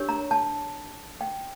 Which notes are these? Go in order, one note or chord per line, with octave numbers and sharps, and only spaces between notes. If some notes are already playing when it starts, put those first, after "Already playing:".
Already playing: D4 G4 A#4 C#5
A#5
A5
G5